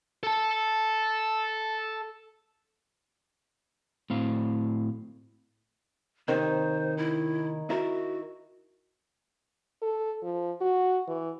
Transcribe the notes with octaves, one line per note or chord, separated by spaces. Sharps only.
A4 A5
A2 C4 F5
D#2 C3 D#3 C5
E4
E4 F#4 A#4
A4
F3
F#4
E3